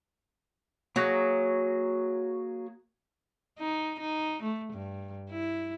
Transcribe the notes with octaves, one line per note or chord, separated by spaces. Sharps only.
F#3 A#3 F#4 G#4
D#4
D#4
A3
G2
E4